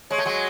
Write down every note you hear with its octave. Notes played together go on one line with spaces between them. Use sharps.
G#3 C#5
A3
F#3 G#3